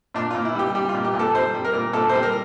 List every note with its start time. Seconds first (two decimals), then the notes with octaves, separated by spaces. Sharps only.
0.14 A#2 D4
0.30 F4
0.35 A#2
0.45 E4
0.55 G3 G4
0.75 G3 G4
0.89 F4
0.95 A#2
1.04 G4
1.14 A#2
1.19 A4
1.34 G3 C5
1.54 G3
1.65 A#4
1.73 A#2
1.93 A#2 A4
2.09 C5
2.14 G3
2.23 A#4